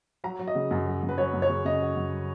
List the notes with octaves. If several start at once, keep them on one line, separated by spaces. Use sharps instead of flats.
F#3 A#5
F#3
D#5
C#3
F#2
F#3
F#2
B4
F#3 C#5
F#2
C#5
C#3
C#3 D#5
F#3
F#2